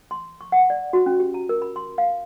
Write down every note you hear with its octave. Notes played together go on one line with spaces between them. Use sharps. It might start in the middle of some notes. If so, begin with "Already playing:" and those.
C6
C#6
F#5
D5
F#4
C#4
G4
A#5
A#4
B5
C6
F5